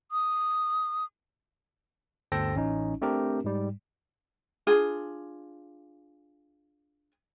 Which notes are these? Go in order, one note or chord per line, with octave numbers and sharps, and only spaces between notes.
D#6
G1 D2 A4 C5 G5 A#6
A1 C#4 D#4
A3 C4 D4 G4 A#4
G#2 G3
D4 F4 G#4